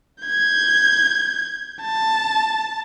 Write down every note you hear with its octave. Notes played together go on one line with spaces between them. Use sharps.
G6 G#6
A5